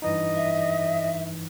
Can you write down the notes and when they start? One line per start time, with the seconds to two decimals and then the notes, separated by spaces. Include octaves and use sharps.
0.02 G2 E3 D#4 D#5
0.36 E5